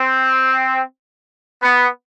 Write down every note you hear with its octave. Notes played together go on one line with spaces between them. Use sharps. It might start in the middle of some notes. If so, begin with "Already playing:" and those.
Already playing: C4
B3